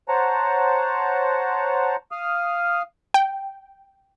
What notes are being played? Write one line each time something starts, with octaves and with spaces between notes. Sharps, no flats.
C5 C#5 F#5 A5 A#5
F5 D#6 F6
G5